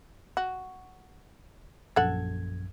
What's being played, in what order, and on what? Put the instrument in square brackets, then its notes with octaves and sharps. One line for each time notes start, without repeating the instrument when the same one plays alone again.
[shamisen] F#4
[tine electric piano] A#1 F#2 G#6 [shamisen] A4 F#5